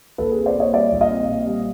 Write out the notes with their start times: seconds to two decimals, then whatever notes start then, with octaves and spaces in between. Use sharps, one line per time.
0.18 A#1 A4 B4
0.32 G#4
0.37 C4
0.46 C5 D5
0.56 A#2 C#5 D#5
0.73 G3 D5 E5
0.92 A#1
1.01 D#5 F5
1.10 C4
1.28 A#2
1.46 G3